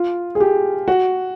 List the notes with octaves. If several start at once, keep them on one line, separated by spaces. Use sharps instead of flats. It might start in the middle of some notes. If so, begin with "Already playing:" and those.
Already playing: F4
G#4
G4
F#4